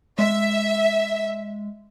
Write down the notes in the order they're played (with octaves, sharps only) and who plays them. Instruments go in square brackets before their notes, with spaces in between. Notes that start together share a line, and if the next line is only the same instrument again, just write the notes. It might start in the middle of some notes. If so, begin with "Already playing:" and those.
[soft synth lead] G#3 [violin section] E5